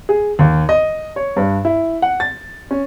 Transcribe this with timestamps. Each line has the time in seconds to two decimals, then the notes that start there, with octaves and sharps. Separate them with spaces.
0.09 G#4
0.39 D#2
0.69 D#5
1.16 C#5
1.36 G2
1.65 E4
2.02 F#5
2.20 A6
2.71 C#4